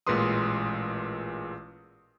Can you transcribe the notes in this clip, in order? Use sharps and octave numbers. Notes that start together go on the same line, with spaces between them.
A1 A#2 G#3 B4 C6 D#6